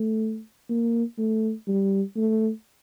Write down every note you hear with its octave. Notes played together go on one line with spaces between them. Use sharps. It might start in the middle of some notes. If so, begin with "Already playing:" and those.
Already playing: A3
A#3
A3
G3
A3